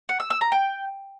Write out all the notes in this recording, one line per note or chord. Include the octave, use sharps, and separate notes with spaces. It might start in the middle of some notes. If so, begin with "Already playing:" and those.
F#5
E6
E6
A#5
G5